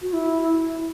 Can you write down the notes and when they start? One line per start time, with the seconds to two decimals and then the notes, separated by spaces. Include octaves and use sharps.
0.02 F#4
0.13 E4